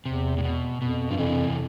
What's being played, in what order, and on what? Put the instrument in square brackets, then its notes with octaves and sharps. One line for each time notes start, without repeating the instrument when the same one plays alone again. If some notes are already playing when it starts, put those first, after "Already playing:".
[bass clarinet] E2 [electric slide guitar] C3
[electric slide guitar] A2
B2
[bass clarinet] F2 [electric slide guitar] B2
[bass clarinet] G2 [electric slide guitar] F3
[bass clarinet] F2 [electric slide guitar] C3 E3